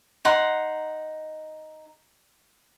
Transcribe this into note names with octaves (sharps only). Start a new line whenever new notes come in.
D#4 F#5 C6